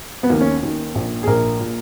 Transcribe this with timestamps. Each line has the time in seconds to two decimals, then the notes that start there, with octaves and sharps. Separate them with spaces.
0.23 B3
0.30 D#2 D#3 A#3
0.41 C#4
0.63 D#2 D#3
0.95 A#1 A#2
1.23 G#4
1.27 A#1 A#2 A#4
1.60 A#2